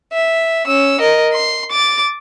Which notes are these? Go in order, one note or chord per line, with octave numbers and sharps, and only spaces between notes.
E5
C#4 E6
A#4 D#5
C6
D6 A6